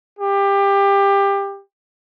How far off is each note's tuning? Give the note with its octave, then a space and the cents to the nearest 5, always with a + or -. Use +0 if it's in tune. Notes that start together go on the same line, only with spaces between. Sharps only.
G4 +20